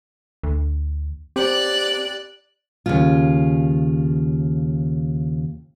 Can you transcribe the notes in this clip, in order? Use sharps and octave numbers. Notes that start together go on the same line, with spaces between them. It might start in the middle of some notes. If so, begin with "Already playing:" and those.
D2
C4 G4 D5 F#6
D#2 C#3 F4